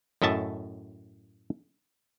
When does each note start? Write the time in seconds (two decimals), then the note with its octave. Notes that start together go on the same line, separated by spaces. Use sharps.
0.22 F#2 A2 D#5 E5 A5